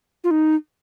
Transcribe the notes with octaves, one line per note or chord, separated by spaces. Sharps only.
F4
D#4